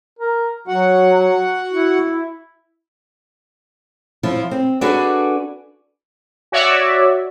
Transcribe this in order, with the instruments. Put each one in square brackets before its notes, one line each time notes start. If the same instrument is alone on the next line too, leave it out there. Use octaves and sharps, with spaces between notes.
[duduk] A#4
[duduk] F#3 [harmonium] F#4 F#5
[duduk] E4
[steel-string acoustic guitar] F3 E4 F4
C4
D4 F#4 G#4 A4 B4 D5
[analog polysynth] F#4 C#5 D5 E5